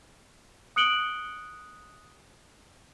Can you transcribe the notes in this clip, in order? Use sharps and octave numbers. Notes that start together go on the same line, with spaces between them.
D#6 F#6 C#7 D7 F#7 G7